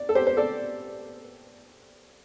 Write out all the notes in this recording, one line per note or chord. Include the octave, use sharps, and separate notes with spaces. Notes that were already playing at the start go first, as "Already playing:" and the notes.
Already playing: D5
A4
G4 C5
C5
A4 D5